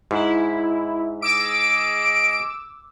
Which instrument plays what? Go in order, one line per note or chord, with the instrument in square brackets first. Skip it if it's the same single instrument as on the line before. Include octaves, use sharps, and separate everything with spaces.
[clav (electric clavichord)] G#2 [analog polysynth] E4
[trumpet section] G#4 D#5 [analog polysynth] D6 E6 [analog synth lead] D7